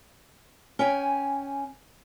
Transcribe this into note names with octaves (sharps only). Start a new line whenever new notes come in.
C#4 G5 G#5